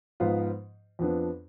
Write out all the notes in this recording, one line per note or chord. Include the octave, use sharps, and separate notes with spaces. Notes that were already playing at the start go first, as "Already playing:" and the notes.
G#2 F3 B3 F4
F2 F3 B3 D4